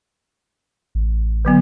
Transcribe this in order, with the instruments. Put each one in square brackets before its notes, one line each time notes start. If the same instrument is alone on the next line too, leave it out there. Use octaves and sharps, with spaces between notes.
[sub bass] A1
[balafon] D3 F#3 B3